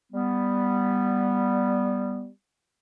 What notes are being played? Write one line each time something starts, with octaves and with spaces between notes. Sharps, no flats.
G3 B3